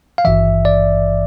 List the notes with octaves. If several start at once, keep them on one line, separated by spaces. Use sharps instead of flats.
F5
G#1 G2 E3 E5
D5